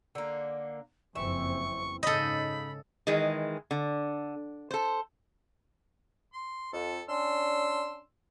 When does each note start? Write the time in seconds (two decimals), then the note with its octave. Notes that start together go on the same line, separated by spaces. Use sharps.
0.15 D3 A#3
1.15 F#1 F2 E3 C4 E5 C#6
2.03 G#2 C#3 D#4 A4 D#5 B5
3.07 D#3 E3 G#3
3.71 D3
4.71 A4 C5
6.33 C6
6.73 F2 A4
7.09 C#4 D4 C6 E6